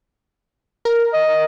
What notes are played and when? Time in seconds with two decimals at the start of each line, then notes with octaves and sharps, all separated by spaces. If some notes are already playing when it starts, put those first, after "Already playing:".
0.85 A#4
1.14 D#5